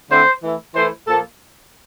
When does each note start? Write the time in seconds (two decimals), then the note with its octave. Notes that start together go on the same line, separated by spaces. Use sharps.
0.10 D3 A3 C4 E4 C5
0.43 E3 A3 E4
0.75 E3 A3 E4 C5
1.08 A#2 F3 A#3 A4